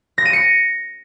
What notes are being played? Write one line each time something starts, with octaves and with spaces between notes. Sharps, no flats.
A#6
D#7
C#7